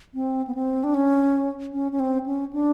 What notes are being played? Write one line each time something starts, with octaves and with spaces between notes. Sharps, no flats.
C4
B3
C4
D4
C#4
C#4
C#4
C4
C#4
D4